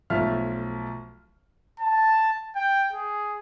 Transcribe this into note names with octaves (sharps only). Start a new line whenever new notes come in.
B1 F3 A3 F4 E5 F6
A5
G5
G#4